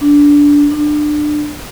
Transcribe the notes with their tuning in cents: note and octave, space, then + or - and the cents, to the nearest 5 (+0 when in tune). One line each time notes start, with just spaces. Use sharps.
D4 -15
D4 +25